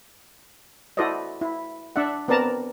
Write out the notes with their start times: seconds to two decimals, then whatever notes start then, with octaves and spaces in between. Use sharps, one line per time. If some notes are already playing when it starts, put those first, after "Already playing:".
0.97 E4 F#4 A4 C5 D5 D#5
1.41 E4
1.96 D4 D5 E5 F#5
2.28 B3 C4 A#4 D5 A5 A#5